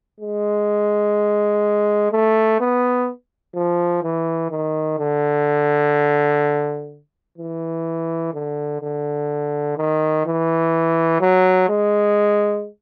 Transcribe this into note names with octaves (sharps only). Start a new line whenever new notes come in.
G#3
A3
B3
F3
E3
D#3
D3
E3
D3
D3
D#3
E3
F#3
G#3